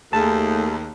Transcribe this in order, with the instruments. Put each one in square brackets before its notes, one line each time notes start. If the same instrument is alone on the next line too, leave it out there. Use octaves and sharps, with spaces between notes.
[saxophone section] D#2 [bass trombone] A3 [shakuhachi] G#4 [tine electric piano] A5